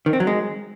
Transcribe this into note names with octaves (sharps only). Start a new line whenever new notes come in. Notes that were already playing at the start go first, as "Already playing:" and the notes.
D#3
C4
F#3
G#3